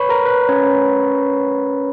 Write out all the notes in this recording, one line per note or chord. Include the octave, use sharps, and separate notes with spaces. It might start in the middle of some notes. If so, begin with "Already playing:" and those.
Already playing: B4 C#5 B5 C#6
A#4 A#5
B4
C#4 C#5